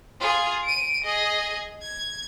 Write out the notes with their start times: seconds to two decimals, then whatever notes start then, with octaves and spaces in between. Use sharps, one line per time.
0.20 F4 G#4
0.64 D7 D#7
1.04 G#4 D#5
1.82 G#6